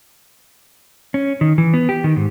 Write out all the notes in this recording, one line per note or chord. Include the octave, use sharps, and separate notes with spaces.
C#4
D#3
E3
B3
G4
D#3
G#2